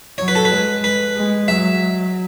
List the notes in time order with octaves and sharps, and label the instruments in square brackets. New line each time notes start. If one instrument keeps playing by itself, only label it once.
[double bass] F#3 [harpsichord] C#5
[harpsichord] B4
A4
B4
[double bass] G#3
[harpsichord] B4
[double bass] G#3
[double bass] F#3 [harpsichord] E5